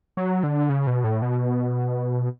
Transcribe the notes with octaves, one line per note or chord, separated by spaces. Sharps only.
F#3
D3
C#3
B2
A2
B2